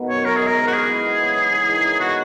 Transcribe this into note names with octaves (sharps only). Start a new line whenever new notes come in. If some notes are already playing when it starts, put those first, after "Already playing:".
Already playing: B2 D#3
F#2 C#5
F#2 A#4
G#4
G#3
A#4
G#2
F#4
E4 G#4
B3
B3
C#3
E3
E3
D#3
C#4
B3 F#4